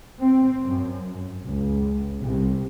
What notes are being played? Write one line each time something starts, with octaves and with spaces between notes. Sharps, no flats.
C4
F#2
C#2
C2